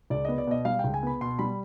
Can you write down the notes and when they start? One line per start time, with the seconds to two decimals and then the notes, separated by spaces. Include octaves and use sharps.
0.10 C#2 D5
0.25 B3 D#5
0.38 D5
0.47 B2 D#5
0.65 G3 F5
0.79 C#2 G5
0.94 G#5
1.03 B3 B5
1.21 B2 C6
1.39 G3 B5